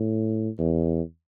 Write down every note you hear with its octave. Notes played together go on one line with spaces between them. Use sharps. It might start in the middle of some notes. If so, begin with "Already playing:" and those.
Already playing: A2
E2